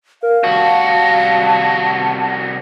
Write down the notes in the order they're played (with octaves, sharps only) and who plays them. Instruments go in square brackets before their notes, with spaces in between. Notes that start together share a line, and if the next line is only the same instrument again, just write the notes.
[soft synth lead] A#4 [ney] F5
[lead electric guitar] C2 F#4 [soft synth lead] A5